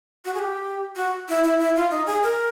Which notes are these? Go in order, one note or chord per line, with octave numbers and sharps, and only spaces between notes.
F#4
G#4
G4
F#4
E4
E4
E4
F4
D#4
G#4
A#4